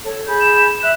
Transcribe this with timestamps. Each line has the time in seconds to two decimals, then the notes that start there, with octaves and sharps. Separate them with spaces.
0.05 A4 C#5
0.27 G#4 B5 G6
0.41 E7
0.82 E5 F#6